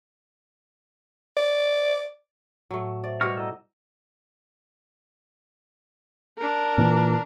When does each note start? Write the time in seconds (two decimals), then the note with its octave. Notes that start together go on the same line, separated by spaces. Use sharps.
1.36 D5
2.71 A2 F#3 A3
3.04 C5 D5 E5
3.21 B2 G3 G4 A#5 C#6 F6
3.37 E4 A4 D#5 F#5 A#5
6.38 D4 A#4
6.78 A#2 E3